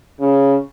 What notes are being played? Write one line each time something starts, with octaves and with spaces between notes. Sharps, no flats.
C#3